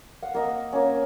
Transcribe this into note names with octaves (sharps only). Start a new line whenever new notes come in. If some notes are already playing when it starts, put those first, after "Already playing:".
F5 F#5
A#3 D#5 E6
A#3 C#4